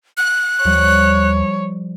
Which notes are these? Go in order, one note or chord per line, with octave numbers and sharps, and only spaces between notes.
F#6
D#2 F3 G3 C#5